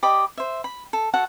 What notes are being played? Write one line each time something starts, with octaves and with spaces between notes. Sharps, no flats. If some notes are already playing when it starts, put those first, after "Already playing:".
G4 D5 D#5 B5
C5 E5
B5
A4
F#4 A4 F#5